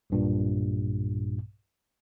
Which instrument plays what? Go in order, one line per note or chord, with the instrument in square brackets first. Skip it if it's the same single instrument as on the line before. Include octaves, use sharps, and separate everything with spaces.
[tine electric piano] B1 G2 A#2